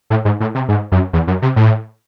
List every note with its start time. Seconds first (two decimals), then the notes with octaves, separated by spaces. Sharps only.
0.10 A2
0.25 G#2
0.40 A2
0.55 C3
0.69 G#2
0.92 F#2
1.13 E2
1.27 F#2
1.42 C3
1.56 A2